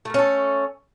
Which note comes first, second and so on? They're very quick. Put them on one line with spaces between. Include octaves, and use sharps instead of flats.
A3 A#4 C#4 A4